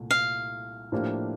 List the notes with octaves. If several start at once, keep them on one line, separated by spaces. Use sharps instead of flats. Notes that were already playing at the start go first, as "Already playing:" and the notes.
Already playing: C2 A#2 A3
F5
A2 F3 A#3 D4 G4